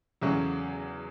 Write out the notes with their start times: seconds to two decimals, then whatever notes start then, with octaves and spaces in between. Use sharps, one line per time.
0.22 E2 C#3 F#3 A3 C#4